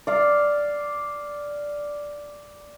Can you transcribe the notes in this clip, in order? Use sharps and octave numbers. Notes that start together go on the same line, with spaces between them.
D5 F5